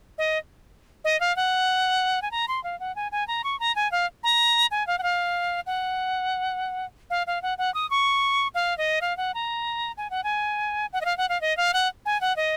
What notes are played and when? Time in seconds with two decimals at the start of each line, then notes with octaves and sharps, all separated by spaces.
0.18 D#5
1.04 D#5
1.20 F5
1.36 F#5
2.22 G#5
2.31 A#5
2.48 C6
2.64 F5
2.80 F#5
2.95 G#5
3.12 G#5
3.28 A#5
3.44 C#6
3.60 A#5
3.76 G#5
3.92 F5
4.23 A#5
4.71 G#5
4.87 F5
4.98 F#5
5.03 F5
5.66 F#5
7.10 F5
7.27 F5
7.42 F#5
7.58 F#5
7.74 D#6
7.90 C#6
8.55 F5
8.78 D#5
9.01 F5
9.17 F#5
9.34 A#5
9.97 G#5
10.10 F#5
10.24 G#5
10.93 F#5
11.01 D#5
11.05 F5
11.17 F#5
11.29 F5
11.41 D#5
11.57 F5
11.73 F#5
12.05 G#5
12.21 F#5
12.36 D#5